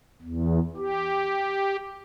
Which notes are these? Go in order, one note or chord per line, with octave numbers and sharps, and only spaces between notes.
E2
G4